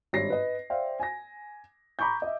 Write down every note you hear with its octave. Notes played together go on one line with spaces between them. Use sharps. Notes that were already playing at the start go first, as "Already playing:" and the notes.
G#1 G2 C#5 A#6 C7
B4 D#5
C5 D5 E5 F5 G5
G#5 A#6
A#5 B5 C#6 D6 G6
D#5 E5